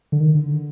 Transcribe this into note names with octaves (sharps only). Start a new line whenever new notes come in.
D3
D#3
D3